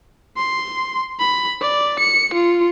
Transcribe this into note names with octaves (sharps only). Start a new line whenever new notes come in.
C6
B5
D5
C#7
F4